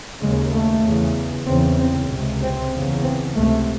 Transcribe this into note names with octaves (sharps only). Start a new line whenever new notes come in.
D#2 C#3 G#3
A3
E2 C#3
E2 C#3 C4
C4
C#2 C3
C4
E2 C#3
C4
C#2 C3 A3